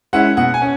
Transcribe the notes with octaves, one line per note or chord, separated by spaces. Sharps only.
G#3 C#4 E4 F#5
B2 F#5
G#5
C#4